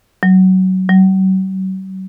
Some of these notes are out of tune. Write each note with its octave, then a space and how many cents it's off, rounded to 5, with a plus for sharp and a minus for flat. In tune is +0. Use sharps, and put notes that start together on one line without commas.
F#3 +20
F#3 +45